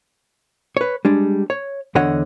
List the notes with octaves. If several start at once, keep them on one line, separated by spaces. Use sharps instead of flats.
B4 C#5
G3 G#3 D4
C#5
E2 D3 C#5 D#5 F#5